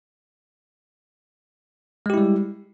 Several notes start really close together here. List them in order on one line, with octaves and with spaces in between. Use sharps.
G#3 G4 E4 G3